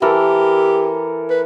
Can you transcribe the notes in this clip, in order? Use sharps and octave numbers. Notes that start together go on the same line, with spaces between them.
E3 G4 A4 A#4
B4